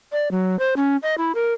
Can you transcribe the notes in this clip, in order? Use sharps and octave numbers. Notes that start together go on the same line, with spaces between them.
D5
F#3
C5
C#4
D#5
E4
A#4